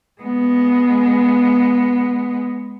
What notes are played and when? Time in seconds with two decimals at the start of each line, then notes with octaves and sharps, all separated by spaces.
0.21 G#3 B3